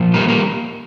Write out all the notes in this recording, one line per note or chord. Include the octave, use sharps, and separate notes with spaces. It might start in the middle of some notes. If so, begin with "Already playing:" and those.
Already playing: A#2 F3
G3 A#3
G3 A#3